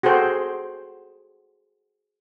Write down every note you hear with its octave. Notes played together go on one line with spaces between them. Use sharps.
F#4 G#4 A4 C5 G5